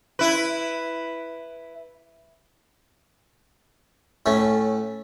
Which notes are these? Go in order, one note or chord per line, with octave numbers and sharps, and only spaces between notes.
E4 B4
A2 A3 C#4